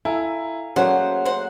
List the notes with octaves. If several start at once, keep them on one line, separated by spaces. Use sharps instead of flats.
E4 A4 F5 G#5 A#5
F#3 A3 A#3 C#4 G#4 C5 F#5
C5 F#5